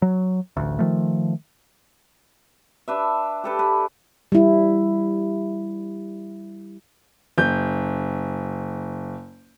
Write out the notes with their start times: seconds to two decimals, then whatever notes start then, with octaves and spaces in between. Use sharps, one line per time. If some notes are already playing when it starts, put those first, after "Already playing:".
0.02 F#3
0.57 A1 D2
0.79 D#3 F3 A3
2.88 D4 B4 E5
3.44 G4 A4 B4
3.59 B4
4.32 G3 E4
7.38 F#1 G6